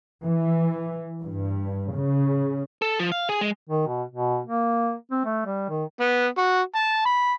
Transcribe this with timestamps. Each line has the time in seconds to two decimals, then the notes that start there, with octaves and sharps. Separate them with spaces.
0.22 E3
1.22 G2
1.96 C#3
2.82 A4
2.99 F3
3.12 F5
3.29 G#4
3.41 G#3
3.69 D#3
3.87 B2
4.11 B2
4.45 A#3
5.11 C4
5.25 A3
5.46 G3
5.69 D#3
6.00 B3
6.38 F#4
6.75 A5
7.05 B5